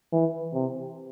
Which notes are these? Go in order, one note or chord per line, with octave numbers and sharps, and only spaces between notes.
E3
C3